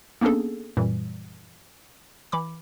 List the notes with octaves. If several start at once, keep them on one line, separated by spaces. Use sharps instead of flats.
A#3 B3 C#4 D4 G#4 A4
F#2 A#2 E3 G3
E3 B5 D6